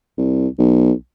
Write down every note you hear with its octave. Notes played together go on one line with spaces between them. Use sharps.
C2
B1